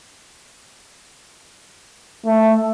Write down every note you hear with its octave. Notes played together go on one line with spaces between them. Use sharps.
A3